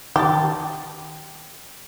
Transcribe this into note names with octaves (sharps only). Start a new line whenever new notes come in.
D#3 G4 A5 A6